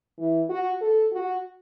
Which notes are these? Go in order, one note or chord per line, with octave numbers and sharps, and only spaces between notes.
E3
F#4
A4
F#4